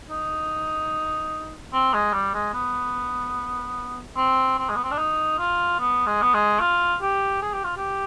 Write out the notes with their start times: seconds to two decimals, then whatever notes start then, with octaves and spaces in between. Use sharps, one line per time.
0.10 D#4
1.73 C4
1.94 G#3
2.13 G3
2.34 G#3
2.54 B3
4.16 C4
4.58 C4
4.69 G#3
4.76 B3
4.84 C4
4.91 D4
4.98 D#4
5.38 F4
5.80 B3
6.07 G#3
6.22 B3
6.34 G#3
6.60 F4
7.01 G4
7.42 G#4
7.53 G4
7.64 F4
7.77 G4